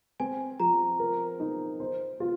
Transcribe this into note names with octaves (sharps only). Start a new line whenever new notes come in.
C4 G#5
F3 A#5
A#4
D#4
C5
F4